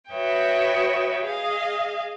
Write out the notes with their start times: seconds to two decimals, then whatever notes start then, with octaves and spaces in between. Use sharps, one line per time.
0.11 F#4 B4 C#5 D#5 E5 G5
1.22 G#4 D#5 F5